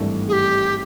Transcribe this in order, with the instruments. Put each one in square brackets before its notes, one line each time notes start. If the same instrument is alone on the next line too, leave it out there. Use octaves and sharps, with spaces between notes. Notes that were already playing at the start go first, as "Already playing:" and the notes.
Already playing: [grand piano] G#1 G2 E3 A3 D4
[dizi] G#4
G4